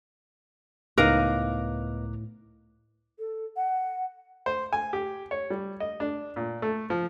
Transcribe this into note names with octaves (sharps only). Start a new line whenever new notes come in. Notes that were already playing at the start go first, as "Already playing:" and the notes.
C#2 A2 B3 D#4 A#4 F5 D6 F#6
A4
F#5
C5
G#5
G4
C#5
G3
D#5
D4
A#2
A3
F3